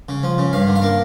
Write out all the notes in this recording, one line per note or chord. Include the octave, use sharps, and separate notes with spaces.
C#3
F3
C#3
G2 F5
D3
F5
A#3